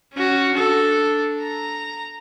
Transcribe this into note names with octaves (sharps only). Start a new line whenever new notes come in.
C#4 F#4
D4 A4
A#5